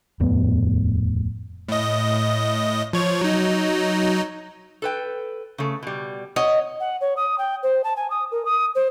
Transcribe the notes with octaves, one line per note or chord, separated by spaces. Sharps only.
D#1 F2 A2 B3
A2 D#5
F3 C#5
F#3 D#4
A4 B4 G5
C#3 A3
B2 G3
C#5 D#5 F#5
F#5
C#5
D#6
G5
C5
A5
G#5
D#6
A#4
D#6
C5